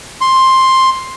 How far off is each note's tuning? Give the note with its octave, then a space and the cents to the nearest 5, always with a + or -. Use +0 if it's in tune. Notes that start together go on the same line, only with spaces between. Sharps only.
C6 +10